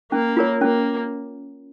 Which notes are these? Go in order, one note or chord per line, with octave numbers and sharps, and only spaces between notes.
A#3 C#4
F4 A#4 C#5
A#3 C#4